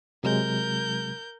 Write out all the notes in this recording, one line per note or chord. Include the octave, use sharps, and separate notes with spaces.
C3 F#3 G#3 A#4 G6